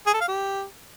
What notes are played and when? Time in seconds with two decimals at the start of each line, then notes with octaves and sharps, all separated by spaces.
0.07 G#4
0.14 A4
0.21 F5
0.28 G4